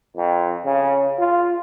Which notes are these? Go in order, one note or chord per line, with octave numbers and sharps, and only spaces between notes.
F2
C#3
F4